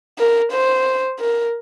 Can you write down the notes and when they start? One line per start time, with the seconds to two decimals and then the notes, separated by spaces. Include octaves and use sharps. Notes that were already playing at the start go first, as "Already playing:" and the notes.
0.18 A#4
0.52 C5
1.20 A#4